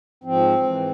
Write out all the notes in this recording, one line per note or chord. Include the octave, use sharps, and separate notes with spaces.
G#2 F3 C4
G#2 E3